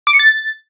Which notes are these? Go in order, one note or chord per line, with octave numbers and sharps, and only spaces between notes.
D6
C#7
A6